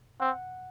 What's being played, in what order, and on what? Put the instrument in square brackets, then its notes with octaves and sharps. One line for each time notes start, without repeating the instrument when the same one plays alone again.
[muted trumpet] C4 [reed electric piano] F#5